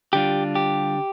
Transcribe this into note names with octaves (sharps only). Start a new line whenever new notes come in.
D3 G3 D4 F4 G4
G4